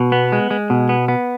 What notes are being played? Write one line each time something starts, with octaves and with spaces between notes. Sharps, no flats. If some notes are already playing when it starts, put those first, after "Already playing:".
Already playing: B2
B3
G#3
G#3
B2
B3
B3